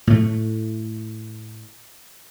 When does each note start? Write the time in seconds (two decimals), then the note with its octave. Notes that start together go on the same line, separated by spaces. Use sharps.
0.07 A2 A3